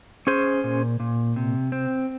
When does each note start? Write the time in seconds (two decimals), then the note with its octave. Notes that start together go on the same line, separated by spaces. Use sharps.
0.27 C#4 G#4 C5
0.64 A#2
1.00 A#2
1.36 C3
1.72 C4